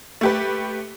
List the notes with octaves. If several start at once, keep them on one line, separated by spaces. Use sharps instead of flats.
A3 G4 B4